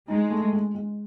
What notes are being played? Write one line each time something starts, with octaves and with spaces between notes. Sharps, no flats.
G#3 D#4
A3
G#3
G#3